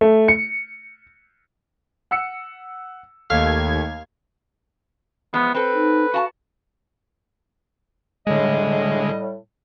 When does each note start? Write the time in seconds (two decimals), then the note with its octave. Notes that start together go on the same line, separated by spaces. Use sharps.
0.01 A3
0.28 C#7
2.11 F#5 E6 C#7
3.30 D#2 A3 F5 G#6
5.34 E2 F3 G#3 B3
5.55 C4 A4 B4
5.74 D#4
6.14 F#4 F5 A5
8.27 A2 D3 G3 G#3 D#5